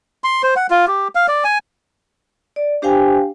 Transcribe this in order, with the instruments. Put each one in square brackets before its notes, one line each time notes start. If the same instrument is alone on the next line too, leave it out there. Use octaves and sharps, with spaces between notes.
[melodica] C6
C5
F#5
F4
G4
F5
D5
G#5
[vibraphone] D5
D4 G4 C5 F5 G5 G#5